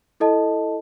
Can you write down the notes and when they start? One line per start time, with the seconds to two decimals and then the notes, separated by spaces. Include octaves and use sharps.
0.20 E4 A4 D#5 A5